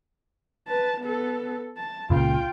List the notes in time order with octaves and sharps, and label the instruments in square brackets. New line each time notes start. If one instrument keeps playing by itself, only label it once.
[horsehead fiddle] B4 A5
B3 A4
A5
[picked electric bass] C#2 A#2 C#3 [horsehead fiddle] F4 G5